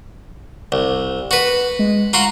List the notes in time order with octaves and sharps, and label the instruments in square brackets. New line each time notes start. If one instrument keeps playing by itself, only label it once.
[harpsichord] C2
F#4 B4
[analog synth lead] G#3
[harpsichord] F4 F#4 C6 [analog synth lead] A#5